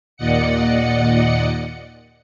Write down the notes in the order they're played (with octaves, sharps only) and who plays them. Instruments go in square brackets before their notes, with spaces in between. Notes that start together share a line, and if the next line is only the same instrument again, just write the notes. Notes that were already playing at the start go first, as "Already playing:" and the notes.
[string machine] D#2 A#2 D5 D#5 F#5 C#7